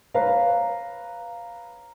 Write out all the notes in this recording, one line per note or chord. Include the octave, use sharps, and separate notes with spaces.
B4 C#5 F5 A#5